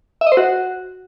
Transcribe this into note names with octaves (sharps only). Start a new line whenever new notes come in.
E5
D#5
C5
F#4